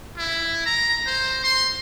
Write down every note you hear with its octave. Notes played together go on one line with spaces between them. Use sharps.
E4
A#5
C5
C6